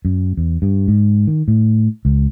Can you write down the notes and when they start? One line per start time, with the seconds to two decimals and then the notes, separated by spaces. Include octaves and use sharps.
0.05 F#2
0.37 E2
0.62 G2
0.88 G#2
1.27 D#3
1.48 A2
2.05 C#2